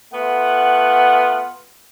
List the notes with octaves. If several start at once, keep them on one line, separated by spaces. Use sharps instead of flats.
A3 B3 F4 F#5